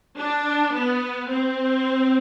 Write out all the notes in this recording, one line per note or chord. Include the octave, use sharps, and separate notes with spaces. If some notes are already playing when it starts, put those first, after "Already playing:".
D4
B3
C4